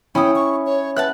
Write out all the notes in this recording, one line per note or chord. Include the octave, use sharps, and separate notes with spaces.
C#4 E4 G5 B5 D#6
C#6
C#5
B4 E5 F#5 A5 F#6